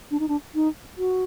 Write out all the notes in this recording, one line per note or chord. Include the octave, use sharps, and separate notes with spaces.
D4
D#4
D4
D#4
F#4